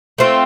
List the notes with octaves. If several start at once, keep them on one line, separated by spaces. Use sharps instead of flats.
A3 C4 F4